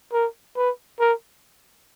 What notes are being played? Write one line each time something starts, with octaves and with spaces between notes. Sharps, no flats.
A#4
B4
A#4